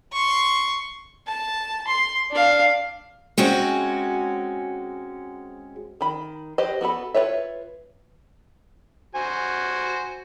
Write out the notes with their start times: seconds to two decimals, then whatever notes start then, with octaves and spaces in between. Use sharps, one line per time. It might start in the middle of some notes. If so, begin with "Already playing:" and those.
0.13 C6 C#6
1.27 A5
1.87 C6
2.30 D4 F5
3.38 G#3 C4 C#4 F#4
6.01 D#3 B5
6.58 G4 B4 C5 D#5
6.81 B3 F#4 A4 B5
7.14 F4 A#4 B4 C#5 E5
9.15 F#4 C5 G#5